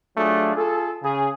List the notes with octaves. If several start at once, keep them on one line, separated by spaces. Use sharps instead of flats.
F#3 A3 D4 F4 G#4
F4 G#4 A4
C#3 G#4